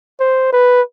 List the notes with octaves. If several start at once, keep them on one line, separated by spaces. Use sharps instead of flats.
C5
B4